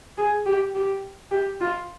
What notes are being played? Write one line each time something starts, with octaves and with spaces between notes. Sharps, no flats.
G#4
G4
G4
G4
F4